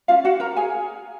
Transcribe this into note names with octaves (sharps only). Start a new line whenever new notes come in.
C#4 F4 F5
F#4 F#5
A#4 A#5
G#4 G#5